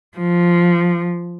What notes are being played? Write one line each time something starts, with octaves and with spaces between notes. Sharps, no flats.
F3